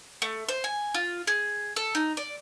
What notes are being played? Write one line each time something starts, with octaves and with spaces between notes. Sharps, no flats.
A3
C5
G#5
F4
G#4
A4
D#4
D5